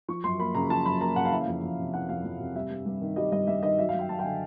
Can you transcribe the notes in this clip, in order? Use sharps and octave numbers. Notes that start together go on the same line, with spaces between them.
F3 C#6
F#2 C6
A#3 B5
C#3 A#5
F3 A5
F#2 B5
A#3 A#5
C#3 F#5
F5
E3 E5
F5
F2
F2
C3
E3 F#5
F2 F5
F2
C3
G3 E5
G2
G2
D#3
G3 D#5
G2 D#5
G2 E5
D#3 D#5
F#3 E5
F5
F#2 G5
F#2 A5
G5
D3 G#5